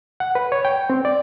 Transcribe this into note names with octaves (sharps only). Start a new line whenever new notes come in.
F#5
B4
C#5
G5
C4
D5